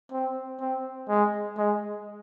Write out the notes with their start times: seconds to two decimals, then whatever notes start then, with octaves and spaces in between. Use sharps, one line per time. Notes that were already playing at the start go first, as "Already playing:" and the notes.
0.12 C4
0.60 C4
1.09 G#3
1.57 G#3